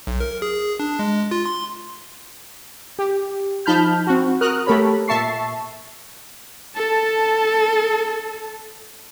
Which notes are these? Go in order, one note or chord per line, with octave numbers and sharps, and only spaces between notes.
B1
A#4
G#4
D4
G#3
F4
C6
G4
F3 D#4 A5 B5 F6 G6
C4 F#4
F#4 A#4 D#6 F6 F#6
A3 G4 A4 A#4 C#5 B5
A#2 E5 A5 C#6 C7
A4 A5